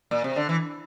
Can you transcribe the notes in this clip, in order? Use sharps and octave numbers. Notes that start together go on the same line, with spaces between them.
A#2
C3
D3
E3